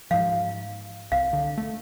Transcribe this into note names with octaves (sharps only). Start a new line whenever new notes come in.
G#2 F3 F5
C2 F5
D3
A3